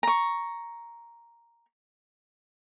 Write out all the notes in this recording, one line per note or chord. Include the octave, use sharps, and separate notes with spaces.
A#5 C#6